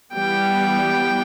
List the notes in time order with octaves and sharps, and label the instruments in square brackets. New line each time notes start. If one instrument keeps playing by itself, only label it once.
[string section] E3 G3 B3 [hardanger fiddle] G5